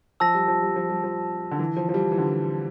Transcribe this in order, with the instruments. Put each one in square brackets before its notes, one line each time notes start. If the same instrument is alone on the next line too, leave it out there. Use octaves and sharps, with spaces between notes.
[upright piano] F3 [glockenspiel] A5 E6 A#6
[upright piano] G3
F3
G3
F3
G3
F3
D3
E3
F3
F3
G3
E3
D3
E3